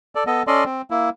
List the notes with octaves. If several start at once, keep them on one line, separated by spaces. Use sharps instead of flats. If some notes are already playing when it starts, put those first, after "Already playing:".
A4 D5
B3 A4 D#5
C#4 A4 D5 D#5 C6
C4
A#3 E4